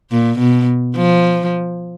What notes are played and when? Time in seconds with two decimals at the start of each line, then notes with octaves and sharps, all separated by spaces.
0.11 A#2
0.39 B2
0.96 F3